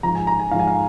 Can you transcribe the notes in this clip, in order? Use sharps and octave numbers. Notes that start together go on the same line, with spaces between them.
G#2 F3 A#5
G#5
A#5
G#5
G#2 F3 F5
G#5
F5